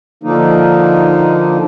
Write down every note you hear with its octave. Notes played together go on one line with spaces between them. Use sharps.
D3 F3 A#3 D#4